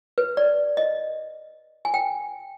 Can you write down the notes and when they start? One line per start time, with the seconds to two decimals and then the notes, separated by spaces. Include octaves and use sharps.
0.18 B4
0.37 D5
0.77 D#5
1.85 G#5
1.94 G5